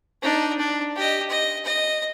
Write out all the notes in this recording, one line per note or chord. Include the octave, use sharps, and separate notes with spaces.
D4 D#4
D4
G4 D#5
D#5
D#5